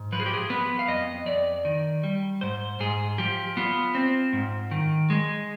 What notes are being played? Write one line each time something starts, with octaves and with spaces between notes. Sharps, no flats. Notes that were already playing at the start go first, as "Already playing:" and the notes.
Already playing: G#2
F3 B4
G#4
G4
G#4
B3 B4
F5
F2 D#5
F2 D5
D#3
G3
G#2 C5
G#2 G#4
F3 G4
B3 F4
C4
G#2
D#3
G#3